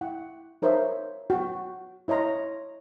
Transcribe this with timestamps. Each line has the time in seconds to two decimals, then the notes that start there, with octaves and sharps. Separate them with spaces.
0.01 E4 F#5 G5
0.62 D#4 A#4 C5 C#5 E5
1.30 F#4 G5
2.08 E4 C#5 D#5 A#5 C6